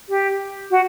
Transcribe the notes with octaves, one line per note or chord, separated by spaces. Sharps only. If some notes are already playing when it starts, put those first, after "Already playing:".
G4
F#4